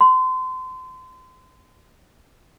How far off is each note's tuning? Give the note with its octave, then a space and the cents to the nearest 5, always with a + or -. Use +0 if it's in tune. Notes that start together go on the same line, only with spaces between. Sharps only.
C6 -30